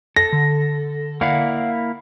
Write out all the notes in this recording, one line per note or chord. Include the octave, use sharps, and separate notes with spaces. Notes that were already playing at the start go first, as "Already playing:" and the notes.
A4 A#6
D3
A#3 E4 D5 F5 F#5